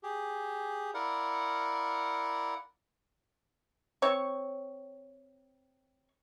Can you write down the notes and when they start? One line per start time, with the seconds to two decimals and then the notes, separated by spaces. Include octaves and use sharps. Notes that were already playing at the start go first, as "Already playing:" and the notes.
0.03 G4 G#4
0.94 E4 A#4 D5 F5 F#5
4.02 C4 C#5 C#6